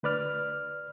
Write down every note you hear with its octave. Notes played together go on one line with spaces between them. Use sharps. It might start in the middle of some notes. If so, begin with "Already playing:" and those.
D2 B4 D5 F6